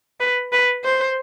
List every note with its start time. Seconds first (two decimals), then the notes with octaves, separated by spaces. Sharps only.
0.20 B4
0.52 B4
0.85 C5